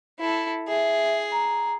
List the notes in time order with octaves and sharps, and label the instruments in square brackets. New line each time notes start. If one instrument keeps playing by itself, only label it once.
[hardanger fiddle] E4 A4
[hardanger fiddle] G#4 [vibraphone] E5
[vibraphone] A#5